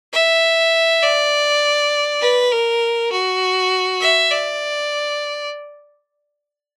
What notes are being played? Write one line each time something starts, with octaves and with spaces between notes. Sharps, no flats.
E5
D5
B4
A#4
F#4
E5
D5